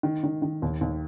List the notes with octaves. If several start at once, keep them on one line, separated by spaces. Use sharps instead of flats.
D#3
D#3
D#3
D#2
D#2